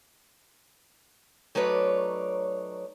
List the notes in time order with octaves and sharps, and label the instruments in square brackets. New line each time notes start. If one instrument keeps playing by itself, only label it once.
[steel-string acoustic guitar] F#3 A3 D#4 B4 C#5 D5